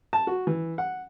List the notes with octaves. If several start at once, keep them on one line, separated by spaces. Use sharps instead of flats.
A5
F#4
E3
F#5